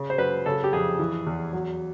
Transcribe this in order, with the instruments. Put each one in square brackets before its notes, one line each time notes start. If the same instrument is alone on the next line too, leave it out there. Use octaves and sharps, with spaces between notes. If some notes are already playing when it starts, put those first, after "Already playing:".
Already playing: [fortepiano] C#3
C5
F#2 B4
C#3 A4
G4
F2 G#4
E3
E2
F#3